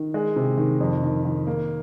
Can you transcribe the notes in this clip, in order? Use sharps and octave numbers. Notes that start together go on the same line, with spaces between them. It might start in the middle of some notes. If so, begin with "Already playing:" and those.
Already playing: D#3
G#3
C3
D#3
F2
D#3
D#3
A#3